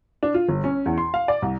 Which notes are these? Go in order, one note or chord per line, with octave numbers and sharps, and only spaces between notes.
D4
F4
G1
C#4
E2
C6
F5
D5
C2